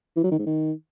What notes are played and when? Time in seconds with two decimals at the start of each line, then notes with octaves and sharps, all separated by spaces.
0.16 E3
0.24 F#3
0.31 D#3
0.39 G#2
0.46 D#3